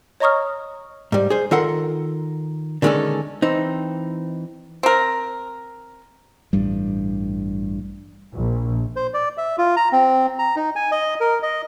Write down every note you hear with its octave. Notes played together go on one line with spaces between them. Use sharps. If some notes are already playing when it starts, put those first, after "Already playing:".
C#5 D#5 A#5 C#6 D#6 F6
G#2 G3
G#4 C5
D#3 F4 A4 A#4 F#5 C6
D3 D#3 G#3 C4 C#4 A4
E3 C4 D#4
C4 A#4
A1 G2 G3
A#1
C5
D5
E5
F4
A#5
C4
A#5
D#4
G#5
D#5
A#4
D#5